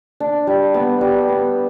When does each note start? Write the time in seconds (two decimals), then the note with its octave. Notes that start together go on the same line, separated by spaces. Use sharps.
0.20 D4
0.47 G3
0.74 B3
1.01 G3
1.28 B3